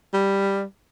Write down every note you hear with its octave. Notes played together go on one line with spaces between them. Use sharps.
G3